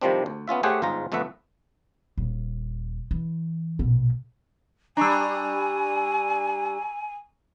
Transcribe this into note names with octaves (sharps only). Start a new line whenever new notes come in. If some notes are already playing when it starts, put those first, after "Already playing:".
C3 D#3 F3 G3 C4 D4
D2
B3 C#4 F4 E5
A3 G4 G#4 C5 C#5 F#5
G1 G#2 G#3 F4 A#5
G1 F2 A3 B4 E5 F#5
D#1
E3
A#1 B2
G3 D4 G#5 A#5 C#6 E6